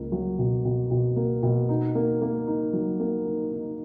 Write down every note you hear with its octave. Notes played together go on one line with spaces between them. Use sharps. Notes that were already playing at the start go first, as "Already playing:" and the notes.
Already playing: C#2 A#3
F#3
B2
B2
B2
A#3
B2
D#4
A#3
A#3
D#4
F#3
A#3
D#4
D#4